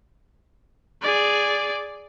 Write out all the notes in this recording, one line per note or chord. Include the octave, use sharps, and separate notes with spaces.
G#4 D5